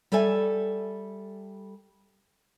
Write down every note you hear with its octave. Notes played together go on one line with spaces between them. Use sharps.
G3 A4 D5 E5 G#5